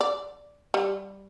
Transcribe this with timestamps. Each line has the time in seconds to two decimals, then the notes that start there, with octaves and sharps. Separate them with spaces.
0.01 D5
0.74 G3